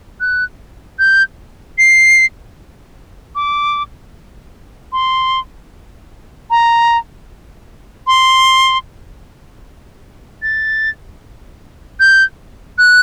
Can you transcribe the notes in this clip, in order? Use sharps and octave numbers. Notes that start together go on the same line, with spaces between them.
F#6
G6
C7
D6
C6
A#5
C6
A6
G6
F#6